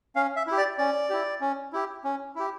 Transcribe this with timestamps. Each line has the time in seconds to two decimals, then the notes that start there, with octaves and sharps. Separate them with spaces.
0.16 C#4 F5
0.36 E5
0.47 E4 G4
0.58 D5
0.78 C#4 D5
1.10 E4 G4
1.41 C#4
1.73 E4 G4
2.04 C#4
2.35 E4 G4